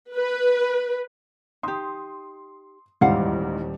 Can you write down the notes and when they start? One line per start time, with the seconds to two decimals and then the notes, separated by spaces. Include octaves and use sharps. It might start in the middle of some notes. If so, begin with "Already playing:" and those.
0.15 B4
1.63 D#4 G4 C6 D#6
3.01 D#1 E2 G#2 G3 F4 F5 F#5